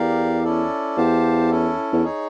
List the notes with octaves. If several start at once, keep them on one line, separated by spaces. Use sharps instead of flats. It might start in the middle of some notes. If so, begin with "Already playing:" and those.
Already playing: E2 G4 A#4 D5 F5
C#4 E4 A4 D5
E2 G4 C5 F5 A5
C#4 E4 A4
E2
D#4 G#4 C#5